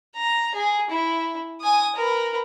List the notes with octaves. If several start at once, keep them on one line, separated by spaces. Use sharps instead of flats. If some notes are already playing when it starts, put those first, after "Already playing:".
A#5
G#4
E4
G#5 D#6
A#4 B4